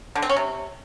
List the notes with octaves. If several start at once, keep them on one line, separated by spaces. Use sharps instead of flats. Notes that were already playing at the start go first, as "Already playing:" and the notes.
D3
C4
C#4
C3